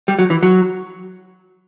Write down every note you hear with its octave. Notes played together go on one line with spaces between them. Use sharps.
G3
F#3
E3
F#3